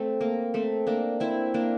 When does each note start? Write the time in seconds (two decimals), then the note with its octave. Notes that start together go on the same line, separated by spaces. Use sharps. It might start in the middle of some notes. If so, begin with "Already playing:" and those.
Already playing: A3 C4
0.21 A#3
0.54 A3 C4
0.87 A#3 D4
1.20 C4 E4
1.54 A#3 D4